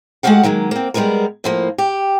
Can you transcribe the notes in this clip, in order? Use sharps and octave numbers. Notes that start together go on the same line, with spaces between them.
G#3 A3 F#4 G4 F5 F#5
D#3 F#3 G#3 A#3
A#3 C4
G3 G#3 B3 D#4 A#4
A2 F3 A#3
G4